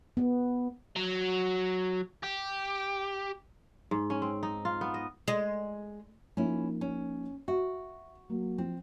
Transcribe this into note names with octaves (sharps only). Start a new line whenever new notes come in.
B3
F#3
G4
G#2
C#4
C4
D#4
F4
B3
D#5
G#3
F3 A#3 C#4 D#4 E4
C#4
F#4 E5
F#3 A#3
F3 C4